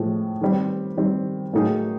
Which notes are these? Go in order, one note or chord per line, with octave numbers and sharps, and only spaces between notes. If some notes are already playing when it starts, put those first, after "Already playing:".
Already playing: A2 F3 G#3
D#3 G3 C4
D#3 G3 C4
A2 F#3 A#3 D#4 G#4